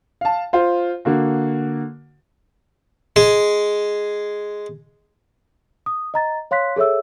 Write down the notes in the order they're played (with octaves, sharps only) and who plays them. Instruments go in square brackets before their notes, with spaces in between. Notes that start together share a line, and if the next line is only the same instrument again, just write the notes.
[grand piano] F5 A5
F4 C5
D3 A#3 F#4
[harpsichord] G#3 G#4
[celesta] D#6
D#5 A#5 A6
C#5 F5 C6 F#6 B6
G#4 A4 C#5 E5 E6